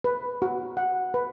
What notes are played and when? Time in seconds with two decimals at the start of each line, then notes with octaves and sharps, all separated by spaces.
0.04 B4
0.42 F#4
0.77 F#5
1.14 B4